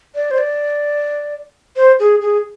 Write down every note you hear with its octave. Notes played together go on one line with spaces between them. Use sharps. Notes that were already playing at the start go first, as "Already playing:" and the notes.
D5
C5
D5
C5
G#4
G#4